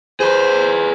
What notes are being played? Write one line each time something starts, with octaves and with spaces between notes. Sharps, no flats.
G#4 B4 C5